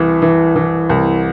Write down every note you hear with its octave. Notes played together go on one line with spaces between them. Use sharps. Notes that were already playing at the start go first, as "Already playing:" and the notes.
Already playing: C2 E3
E3
E3
C2